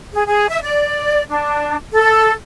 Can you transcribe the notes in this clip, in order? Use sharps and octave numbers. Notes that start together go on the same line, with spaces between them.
G#4
G#4
E5
D5
D4
A4